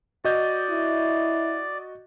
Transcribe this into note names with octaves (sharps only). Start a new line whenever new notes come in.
F#4 D5 D#5 G6
E4